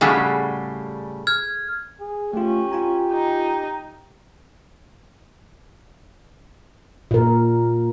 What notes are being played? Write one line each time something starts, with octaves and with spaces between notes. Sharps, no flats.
A2 C#3 G3 F#4 G#4 A4
F6 G#6
G#4
A3 C#4 F4 G4
F4 G#5 A#5
D#4
A#2 A#4